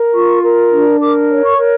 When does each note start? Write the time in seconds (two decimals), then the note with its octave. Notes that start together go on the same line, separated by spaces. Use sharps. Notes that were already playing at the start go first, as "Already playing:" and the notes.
Already playing: A#4
0.13 F4 C#6
0.42 A#4
0.71 D4
1.00 A#4 D6
1.29 C#5
1.44 C#6
1.58 A#4